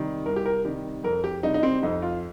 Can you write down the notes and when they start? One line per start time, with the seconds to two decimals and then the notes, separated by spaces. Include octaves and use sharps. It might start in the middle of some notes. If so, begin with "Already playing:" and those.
Already playing: C3 D#3 G3
0.26 C2 A#4
0.36 G4
0.46 A#4
0.65 C3 D#3 G3 G4
1.04 F2 A#4
1.24 G4
1.43 C3 G3 D#4
1.54 D#4
1.63 C4
1.83 F2 D#4
2.02 F4